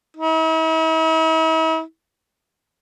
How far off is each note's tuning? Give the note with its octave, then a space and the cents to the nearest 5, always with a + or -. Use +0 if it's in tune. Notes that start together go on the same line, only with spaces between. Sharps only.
E4 -45